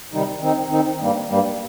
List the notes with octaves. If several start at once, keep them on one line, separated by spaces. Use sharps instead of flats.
C3 D#3 G3 D#4
D#3 C4 D#4
D#3 C4 D#4
G2 G3 A#3
G2 G3 A#3